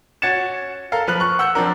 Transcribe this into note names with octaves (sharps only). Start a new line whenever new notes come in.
C#4 F#4 G#6 A6 C#7 E7
A4 A#4 F5 A5
F3 B4 F6 F#6 F#7
C#6 F#6
F#5 E6 F#6 G6 C#7
F3 C4 D4 A#4